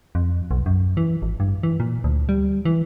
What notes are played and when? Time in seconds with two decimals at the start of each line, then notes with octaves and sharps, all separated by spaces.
0.15 F2
0.51 B1
0.66 F#2
0.97 E3
1.22 G#1
1.40 G2
1.63 E3
1.80 A#2
2.04 D2
2.29 G3
2.65 E3